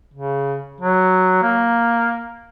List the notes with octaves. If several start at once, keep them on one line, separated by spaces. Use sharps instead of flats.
C#3
F#3
A#3